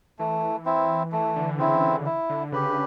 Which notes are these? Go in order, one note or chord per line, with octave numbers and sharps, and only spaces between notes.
E3 A3
C4 E4
E3 A3
D3
D3
C#3 C4 E4
D3
E4
D3
C#3 G4 B4